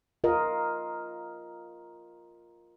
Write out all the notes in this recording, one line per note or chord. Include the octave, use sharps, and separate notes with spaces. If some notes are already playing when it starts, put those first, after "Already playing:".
F4 A#4 D#5